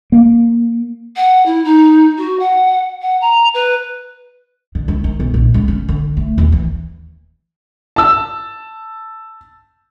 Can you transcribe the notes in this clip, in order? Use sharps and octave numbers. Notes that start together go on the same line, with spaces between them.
A#3
F#5
E4
D#4
F#4
F#5
F#5
A#5
B4
D3
C#2
D#3
B1
A#1
C#2
C#4
D3
A3
D#2
E3
A5 E6